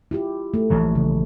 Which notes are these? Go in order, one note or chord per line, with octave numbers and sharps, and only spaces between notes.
E4 F4 G4
A3
A#1 E3 F#3
C#3